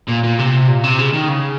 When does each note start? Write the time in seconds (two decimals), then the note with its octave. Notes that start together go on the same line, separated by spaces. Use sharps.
0.09 A#2
0.24 A#2
0.39 C3
0.68 A#2
0.84 C3
0.99 C#3
1.13 D#3
1.28 C#3